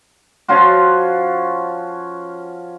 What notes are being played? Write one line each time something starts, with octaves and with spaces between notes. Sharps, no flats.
F3 C#4 F4 F#4